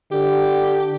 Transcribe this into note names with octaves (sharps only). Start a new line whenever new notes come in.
D3 G4